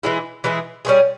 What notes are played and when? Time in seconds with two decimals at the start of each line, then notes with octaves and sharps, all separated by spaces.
0.03 E3 G#3 E4 G#4
0.44 E3 G#3 E4 G#4
0.85 G3 C#4 F4 G#4